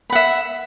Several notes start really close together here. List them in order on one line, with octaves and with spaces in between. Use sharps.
B5 F#5 E5